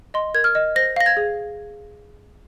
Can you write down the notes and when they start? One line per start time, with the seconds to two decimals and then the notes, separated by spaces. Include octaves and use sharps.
0.14 D#5 C6
0.34 A#4 G#6
0.44 F6
0.55 D#5
0.76 C5 A#6
0.96 F5 A#6
1.06 G#6
1.17 G#4